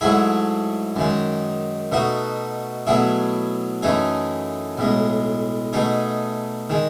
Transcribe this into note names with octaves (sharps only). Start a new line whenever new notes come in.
G#2 F#3 A3 E4 G#4
F#2 D#3 G#3
B2 A3 D#4 F#4
B2 F#3 A3 E4 G#4
F#2 E3 A3 D#4 G#4
B1 A2 G#3
B2 A3 D#4 G#4
D#3 G#3